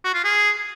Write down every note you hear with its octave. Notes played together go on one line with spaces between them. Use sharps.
F#4
F4
G#4